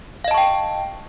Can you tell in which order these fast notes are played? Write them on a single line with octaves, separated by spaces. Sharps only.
F5 D#5 A5 C#6 G5